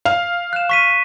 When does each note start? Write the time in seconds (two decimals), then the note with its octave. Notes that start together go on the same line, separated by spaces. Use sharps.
0.05 F5
0.53 F#6 E7
0.69 C#6 B6 D#7